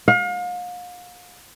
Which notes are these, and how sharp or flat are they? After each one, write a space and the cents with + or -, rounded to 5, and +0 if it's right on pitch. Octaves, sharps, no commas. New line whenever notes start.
F5 +40